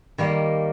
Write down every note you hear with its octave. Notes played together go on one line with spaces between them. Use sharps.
D#3 G3 A#3